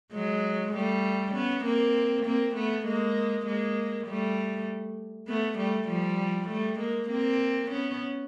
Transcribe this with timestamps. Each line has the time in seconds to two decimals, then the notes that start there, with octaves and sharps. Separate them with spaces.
0.14 F#3 G#3
0.73 G3 A3
1.34 B3 C#4
1.64 A#3 C4
2.25 A#3 C4
2.55 A3 B3
2.86 G#3 A#3
3.46 G#3 A#3
4.07 G3 A3
5.27 A3 B3
5.58 G3 A3
5.88 F3 G3
6.49 G3 A3
6.79 G#3 A#3
7.09 A#3 C4
7.70 B3 C#4